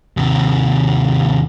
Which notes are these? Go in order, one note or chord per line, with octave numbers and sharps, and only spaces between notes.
D#2 C3